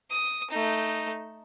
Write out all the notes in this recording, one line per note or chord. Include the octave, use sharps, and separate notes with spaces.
D#6
A3 D#4